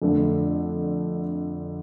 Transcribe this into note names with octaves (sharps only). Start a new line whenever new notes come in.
F2 D3 A3